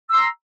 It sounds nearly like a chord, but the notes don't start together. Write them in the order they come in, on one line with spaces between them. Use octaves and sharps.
E6 C6 A#5